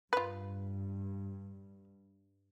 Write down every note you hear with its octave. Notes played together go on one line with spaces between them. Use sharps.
G2 F4 B4